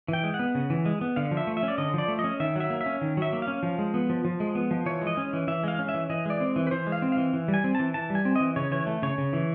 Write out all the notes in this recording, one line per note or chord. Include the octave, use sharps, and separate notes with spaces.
E3 G5
G#3
F#5
B3
C#3
E3
G#3
B3
D3 F5
F3
E5
A3
E5
C#4
D5
D3 D#5
F3 D5
A3
D#5
C#4
D#3 E5
F#3 E5
A#3
E5
C#4
D#3
F#3 E5
A#3
F5
C#4
F3
G#3
B3
F3
F3
G#3
B3
F3
E3 C#5
G#3
D#5
C#4
E3
E3 E5
G#3 F5
C#4
E5
E3
E3 D#5
G#3 D5
C4
E3
B4
E3 C5
G#3
F5
C4
E3 F5
E3
G3
G#5
C4
E3 A5
E3 A5
G3
G#5
C4
E3 D#5
C#3 C#5
E3 C#5
A3
C#3 C#5
C#3
E3